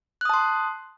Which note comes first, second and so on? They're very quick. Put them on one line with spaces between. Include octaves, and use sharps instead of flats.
F#6 D#6 A5 C6